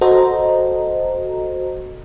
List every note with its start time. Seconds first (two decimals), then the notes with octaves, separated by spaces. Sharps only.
0.01 F#4 A4 C5 D#5 A#5